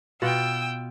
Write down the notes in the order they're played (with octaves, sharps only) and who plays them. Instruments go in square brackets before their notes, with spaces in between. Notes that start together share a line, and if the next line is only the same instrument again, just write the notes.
[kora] B2 F4 F#5 [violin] G5 E6